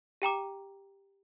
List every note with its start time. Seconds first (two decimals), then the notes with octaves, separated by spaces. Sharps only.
0.22 G4 G5 A#5 D6